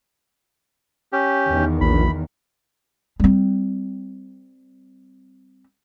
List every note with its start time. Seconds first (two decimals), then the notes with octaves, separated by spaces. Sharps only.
1.13 C#4 G4
1.50 E2 D#3
1.81 A#1 B5
3.20 G3 C4